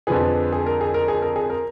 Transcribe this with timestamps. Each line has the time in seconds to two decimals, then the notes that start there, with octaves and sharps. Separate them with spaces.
0.07 F2 D3 F3 G#4 B4
0.53 G#4
0.66 A#4
0.81 G#4
0.94 A#4
1.08 G#4
1.22 A#4
1.36 G#4
1.50 A#4